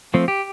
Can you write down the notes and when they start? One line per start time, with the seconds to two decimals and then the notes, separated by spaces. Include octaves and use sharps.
0.14 F3 A3 C4
0.28 G4